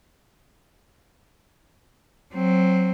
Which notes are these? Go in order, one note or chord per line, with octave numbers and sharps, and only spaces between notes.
F#3 C4